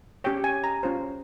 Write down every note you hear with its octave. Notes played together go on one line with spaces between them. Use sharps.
C#4 G4 C#5 G5
G#5
A#5
C#4 F4 C5